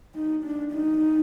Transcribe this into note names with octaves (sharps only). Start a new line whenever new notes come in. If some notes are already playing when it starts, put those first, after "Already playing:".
D#4
D4
D#4